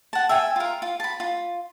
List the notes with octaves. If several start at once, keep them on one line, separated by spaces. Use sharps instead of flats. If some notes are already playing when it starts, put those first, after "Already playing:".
F#5 A5
E5 G5 G#5
F4 A#4
F4
A5 B5
F4